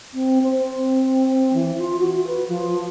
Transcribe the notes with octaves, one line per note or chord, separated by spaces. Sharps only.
C4
C5
C4
E3
F4
F#4
B4
F3